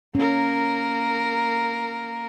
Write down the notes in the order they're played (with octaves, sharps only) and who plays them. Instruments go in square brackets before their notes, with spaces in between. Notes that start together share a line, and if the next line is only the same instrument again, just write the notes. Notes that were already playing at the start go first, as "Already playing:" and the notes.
[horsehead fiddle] A#3 A#4 [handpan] C#4